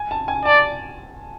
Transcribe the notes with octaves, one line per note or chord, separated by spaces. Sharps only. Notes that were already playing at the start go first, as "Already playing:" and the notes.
Already playing: G#5
A5
G#5
D5 A5